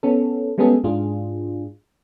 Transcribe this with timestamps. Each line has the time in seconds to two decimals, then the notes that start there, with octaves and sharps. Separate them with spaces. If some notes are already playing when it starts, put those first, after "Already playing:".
0.03 B3 C#4 A4
0.58 G3 G#3 B3 C#4 G#4 A4
0.84 G#2 D4 F4 G#4